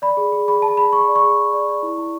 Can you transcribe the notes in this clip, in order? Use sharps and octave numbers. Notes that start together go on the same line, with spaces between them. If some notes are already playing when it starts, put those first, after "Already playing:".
D5 B5
G#4
G#4
G#4 B5
G#4 A5
G#4 B5
G#4 C#6
D5
C#6
G#4
D5
D5
D5
E4
E4